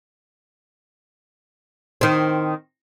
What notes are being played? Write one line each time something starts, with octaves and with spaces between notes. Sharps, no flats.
D#3 C4